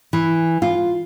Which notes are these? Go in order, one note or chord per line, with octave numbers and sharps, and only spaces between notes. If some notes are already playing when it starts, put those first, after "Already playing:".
E3
F4